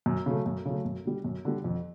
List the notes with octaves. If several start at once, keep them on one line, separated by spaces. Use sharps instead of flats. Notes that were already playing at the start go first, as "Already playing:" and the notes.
F#2
C#3 F#3 A3
F#2
C#3 F#3 A3
F#2
D3 G3
F#2
D3 G3
F2